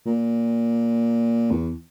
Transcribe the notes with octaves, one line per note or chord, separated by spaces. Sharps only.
A#2
E2